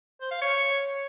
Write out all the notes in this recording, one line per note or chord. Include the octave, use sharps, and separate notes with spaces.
C5
F5
C#5